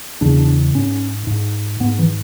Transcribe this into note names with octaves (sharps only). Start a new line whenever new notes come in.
E2 C#3 D4
D4
G#2 C#4
G#2
G#2 B3
E3